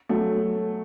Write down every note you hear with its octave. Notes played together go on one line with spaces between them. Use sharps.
F#3 A3